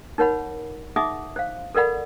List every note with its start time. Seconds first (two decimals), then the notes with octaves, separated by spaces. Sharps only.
0.18 D#4 A#4 C#5 F#5 B5
0.96 D#4 G#4 E5 F#5 D6 D#6
1.36 C5 F5
1.75 A4 A#4 D5 F#5 B5